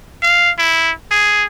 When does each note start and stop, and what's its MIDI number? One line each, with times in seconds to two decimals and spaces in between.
0.22 0.51 77
0.58 0.91 64
1.11 1.45 68